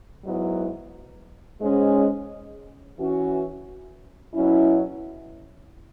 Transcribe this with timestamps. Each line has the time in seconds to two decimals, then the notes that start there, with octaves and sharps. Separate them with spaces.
0.24 G#2 F#3 B3 E4
1.61 G#2 G#3 C#4
2.98 E3 C#4 F#4
4.34 B2 F#3 C#4 E4